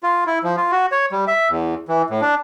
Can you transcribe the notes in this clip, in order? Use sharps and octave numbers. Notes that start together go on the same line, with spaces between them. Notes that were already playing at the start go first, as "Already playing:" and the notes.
F4
E4
F3
F4
F#4
C#5
G3
E5
E2
E3
A2
D4